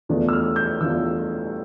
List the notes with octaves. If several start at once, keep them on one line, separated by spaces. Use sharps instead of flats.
E2 E3 A3 D4 F4
E6
F6
G6
E2 E3 A3 D4 F4 E6